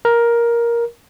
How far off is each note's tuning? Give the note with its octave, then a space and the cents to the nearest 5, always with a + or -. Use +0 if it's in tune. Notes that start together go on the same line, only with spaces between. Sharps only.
A#4 +10